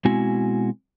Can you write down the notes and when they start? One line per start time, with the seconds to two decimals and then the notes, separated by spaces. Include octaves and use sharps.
0.05 B2 G#3 C4 E4 F#4 G#5